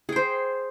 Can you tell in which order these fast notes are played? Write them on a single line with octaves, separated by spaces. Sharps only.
G#4 G5 C5